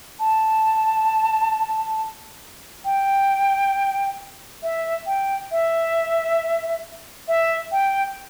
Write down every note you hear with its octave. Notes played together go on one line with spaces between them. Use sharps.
A5
G5
E5
G5
E5
E5
G5